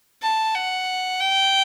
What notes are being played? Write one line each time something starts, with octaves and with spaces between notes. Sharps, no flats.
A5
F#5
G5